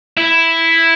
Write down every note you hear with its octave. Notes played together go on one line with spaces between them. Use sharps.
E4